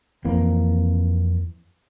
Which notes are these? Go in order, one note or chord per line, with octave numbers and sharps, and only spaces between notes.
F2 E3 A#3 C4